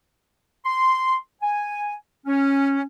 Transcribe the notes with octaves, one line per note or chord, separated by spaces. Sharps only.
C6
G#5
C#4